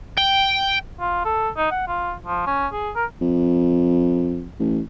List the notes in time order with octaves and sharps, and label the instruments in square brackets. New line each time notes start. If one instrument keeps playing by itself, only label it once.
[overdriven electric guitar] G5
[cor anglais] F4
A4
D#4
F#5
F4
F3
C#4
G#4
A#4
[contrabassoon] F2
A1